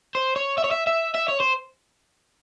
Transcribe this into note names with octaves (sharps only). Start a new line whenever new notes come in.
C5
C#5
E5
C#5
E5
E5
E5
C#5
C5